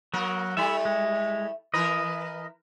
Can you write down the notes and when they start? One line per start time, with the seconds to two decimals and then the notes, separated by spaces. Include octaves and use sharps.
0.14 F#3 A#3 F#4 A#4
0.57 G3 A3 E4 E5 B5
0.85 G#3
1.74 E3 A#4 B4 D#5